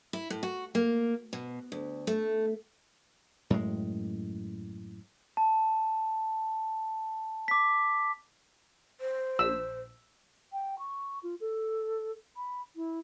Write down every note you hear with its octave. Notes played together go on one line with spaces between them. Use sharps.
E4
A2
F#4
A#3
B2
D2
A3
F#2 A2 G#3
A5
D6 B6
C5
A#1 E6
G5
C#6
F4
A4
B5
E4